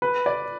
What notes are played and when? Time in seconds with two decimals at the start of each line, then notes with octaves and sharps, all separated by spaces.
0.02 B4
0.26 D5